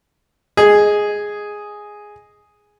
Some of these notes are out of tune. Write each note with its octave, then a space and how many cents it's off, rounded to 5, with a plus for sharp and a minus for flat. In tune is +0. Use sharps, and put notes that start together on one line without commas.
G#4 +0 D#5 +0